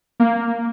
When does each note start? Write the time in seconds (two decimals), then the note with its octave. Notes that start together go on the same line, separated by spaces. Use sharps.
0.20 A#3